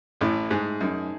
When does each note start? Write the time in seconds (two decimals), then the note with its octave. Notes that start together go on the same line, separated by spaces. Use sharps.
0.21 A1 A2 A3
0.51 G#2 G#4
0.80 F#2 D#4